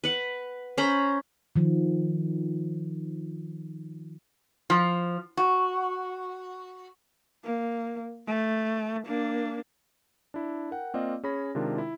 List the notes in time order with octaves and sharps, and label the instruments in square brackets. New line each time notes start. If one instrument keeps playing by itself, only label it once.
[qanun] B4 F#5
C#4 C5 A#5 B5
[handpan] D#3 F3
[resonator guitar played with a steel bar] F3
F#4
[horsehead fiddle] A#3
A3
A#3 D4
[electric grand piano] D4 E4
A#4 F#5 G5
A#3 C4 F4 D5 D#5 F5
C#4 G#4 C#5 B5 A#6
C3 D#3 G#3 D4 F4 A#4
E4